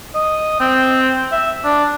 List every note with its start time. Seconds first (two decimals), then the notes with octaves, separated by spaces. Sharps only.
0.15 D#5
0.60 C4
1.32 E5
1.65 D4